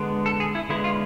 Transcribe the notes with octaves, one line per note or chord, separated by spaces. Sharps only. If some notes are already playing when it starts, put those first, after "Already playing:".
Already playing: D3 G#3 B3
A4
G#4
E4
D3 G#3 B3 E4
F4